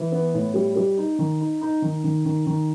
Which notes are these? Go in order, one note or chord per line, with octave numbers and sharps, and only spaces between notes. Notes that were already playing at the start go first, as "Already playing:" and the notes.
Already playing: E3
B3
A2
G3
G3
D#4
D#3
D#4
D#4
D#3
D#3
D#3
D#3